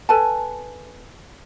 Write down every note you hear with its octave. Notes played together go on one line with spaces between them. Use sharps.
A4 B4 G#5 A5